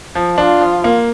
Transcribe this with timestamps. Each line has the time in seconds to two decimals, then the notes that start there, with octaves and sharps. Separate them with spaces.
0.15 F3
0.38 D4 F4
0.61 F3
0.84 A#3